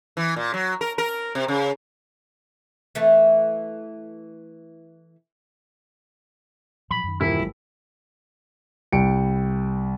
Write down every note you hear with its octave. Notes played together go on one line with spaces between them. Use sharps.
E3
A#2
F#3
A#4
A#4
C3
C#3
E3 A3
A#2 F3 F#3 B5
F#2 D#3
D#1 E3 E4 A#4
G#1 F#3 G#3
C2 G5 C#7 D7